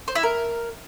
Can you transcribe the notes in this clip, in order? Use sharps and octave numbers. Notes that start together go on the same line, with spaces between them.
C5
E4
A#4